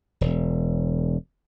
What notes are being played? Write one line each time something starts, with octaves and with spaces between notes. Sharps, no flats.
E1